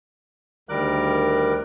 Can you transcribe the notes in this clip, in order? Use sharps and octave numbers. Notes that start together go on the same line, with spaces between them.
D2 D#3 G3 A#4 D6 F#6